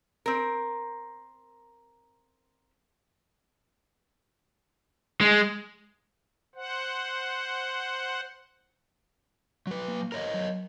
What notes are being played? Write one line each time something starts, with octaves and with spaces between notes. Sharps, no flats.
C4 A#4
G#3
C5 F#5
F#3 B4
A#3
A#4 C#5 D#5 A#5
F#3